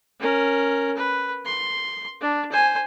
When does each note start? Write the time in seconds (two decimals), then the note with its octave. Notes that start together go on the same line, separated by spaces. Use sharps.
0.20 C#4 A#4
0.97 B4
1.45 C6
2.21 D4
2.52 C5 G#5